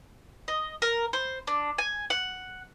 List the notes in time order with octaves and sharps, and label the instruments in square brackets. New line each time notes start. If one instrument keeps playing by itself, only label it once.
[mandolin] D#5
A#4
C5
D4
G#5
F#5